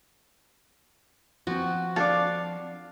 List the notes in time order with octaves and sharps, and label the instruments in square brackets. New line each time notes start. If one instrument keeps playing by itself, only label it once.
[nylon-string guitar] F3 C4 [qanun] F#4
[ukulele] D4 D#4 A4 [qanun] F5